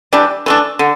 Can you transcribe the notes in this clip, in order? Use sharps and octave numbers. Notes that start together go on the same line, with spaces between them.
E3 G3 D4 G4
E3 A3 D4
D3